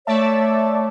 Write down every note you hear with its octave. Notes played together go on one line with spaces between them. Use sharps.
A3 C#5 D5 E5 A5